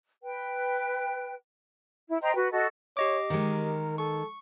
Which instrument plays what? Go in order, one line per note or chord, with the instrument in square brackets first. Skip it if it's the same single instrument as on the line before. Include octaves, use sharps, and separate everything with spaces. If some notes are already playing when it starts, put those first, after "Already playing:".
[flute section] B4 G5
E4
C5 D#5 G5 A#5
F#4 B4
F#4 A4 D#5
[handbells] G4 D#5 D6 [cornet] C#5
[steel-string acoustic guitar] D#3 G#3 [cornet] A#4
[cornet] A4 [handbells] C#6